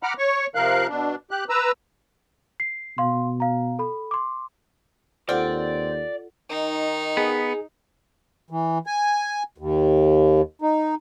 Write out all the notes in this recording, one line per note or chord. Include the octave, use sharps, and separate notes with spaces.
F#5 A#5 B5 D6 F6
C#5 C#6
C3 F3 A#4 F5 F#6
B2 D4
G4 F#6
B4 A#5 E6
C7
B2 F5 C6
F5 A#5
A4 B5
C6 D6
D#2 C4 F4 A4 D5 F#5
D#3 D#4
B3 G#4
E3
G#5
D#2
D#4